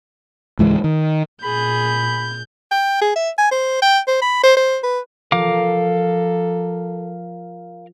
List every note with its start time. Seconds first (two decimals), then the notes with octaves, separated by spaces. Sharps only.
0.59 C#2 G#2 E3 G#3
0.84 D#3
1.43 A#2 G#4 B5 G6
2.71 G5
3.01 G#4
3.16 E5
3.38 G#5
3.51 C5
3.82 G5
4.08 C5
4.22 B5
4.44 C5
4.57 C5
4.83 B4
5.32 F3 A4 A#4 F5 D6